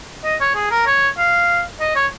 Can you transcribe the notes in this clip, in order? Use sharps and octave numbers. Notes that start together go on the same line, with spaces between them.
D#5
C#5
G#4
A#4
C#5
F5
D#5
C#5